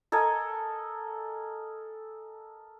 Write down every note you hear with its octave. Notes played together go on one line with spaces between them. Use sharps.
A4 A#4 D#5 G#5